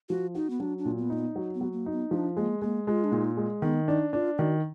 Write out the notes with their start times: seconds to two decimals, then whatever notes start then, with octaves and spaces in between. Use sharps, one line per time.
0.09 F3 F#4
0.35 D#4 F#4
0.50 B3
0.60 F#3 D4
0.78 D4
0.85 A#2
0.98 B3
1.10 A#3 D#4
1.16 B3
1.36 F#3
1.55 B3
1.61 F#3
1.73 A#3
1.86 D#4
1.92 B3
2.11 F3 D4
2.37 G#3 A#3
2.62 G#3 A#3
2.87 G#3 F4
3.04 D4
3.12 A#2 D#4
3.37 G#3
3.62 D#3 B3
3.88 D4 D#4
4.13 D4 F4
4.38 D#3 F#4